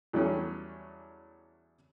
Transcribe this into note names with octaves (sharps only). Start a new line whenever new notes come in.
E2 F#3 G3 A3 C#4